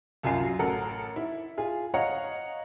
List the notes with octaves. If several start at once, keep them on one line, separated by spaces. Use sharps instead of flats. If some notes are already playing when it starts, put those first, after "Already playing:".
C2 F#2 F4 G#5 C7
F#3
A1 A4 A#4 F#5
E4
F4 G#4
C#5 D#5 F5 F#5 A#5